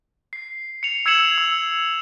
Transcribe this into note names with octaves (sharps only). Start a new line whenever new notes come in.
C7
C#7 F7
E6 G#6 C7 C#7 E7 F#7
E6